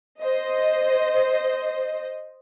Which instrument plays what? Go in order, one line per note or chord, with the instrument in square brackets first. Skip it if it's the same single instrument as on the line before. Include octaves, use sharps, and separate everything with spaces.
[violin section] C5 D#5